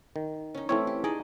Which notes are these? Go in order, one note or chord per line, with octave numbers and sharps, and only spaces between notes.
D#3
C#4 D#4
E3 A3 C4 C#4 E4 C#5
G4
D#4 G#4 D5 D#5